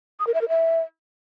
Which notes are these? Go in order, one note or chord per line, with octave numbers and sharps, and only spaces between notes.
D#6
A#4
E5
A#4
E5